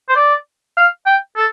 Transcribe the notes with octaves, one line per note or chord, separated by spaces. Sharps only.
C5
D5
F5
G5
A4